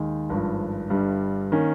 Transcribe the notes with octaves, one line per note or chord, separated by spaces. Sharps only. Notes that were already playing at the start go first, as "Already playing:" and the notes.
Already playing: D#2 D#3 G#3
G#1 G2 F3
G1 G2 G3
D#3 A#3 C#4